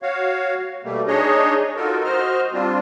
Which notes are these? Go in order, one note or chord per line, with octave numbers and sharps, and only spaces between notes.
F#4 C#5 F5
B2 G3 A3 A#3
D4 D#4 G#4 C#5 D#5
D#4 F4 F#4 A4 A#4
F#4 C5 D#5 F6
G3 C4 D4 F4